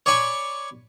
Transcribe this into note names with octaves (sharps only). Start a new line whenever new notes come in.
C#5 D5 G#5 B5 C#6